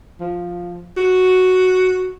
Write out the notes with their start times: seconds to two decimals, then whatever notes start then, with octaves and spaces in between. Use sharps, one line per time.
0.20 F3
0.97 F#4